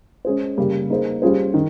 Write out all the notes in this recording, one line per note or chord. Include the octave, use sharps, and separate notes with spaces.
G#3 C#4 G#4 C5
C#3 G3 A#3
A#3 D#4 G#4 C5
G3 C#4 F4 G#4 C5
D#3